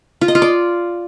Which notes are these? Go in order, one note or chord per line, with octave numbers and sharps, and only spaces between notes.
F4
D#5
F4
D5